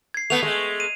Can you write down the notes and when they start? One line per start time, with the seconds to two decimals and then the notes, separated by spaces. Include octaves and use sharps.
0.14 G#6 C7
0.30 A3 B3 F7
0.43 G#3 A3
0.80 D#7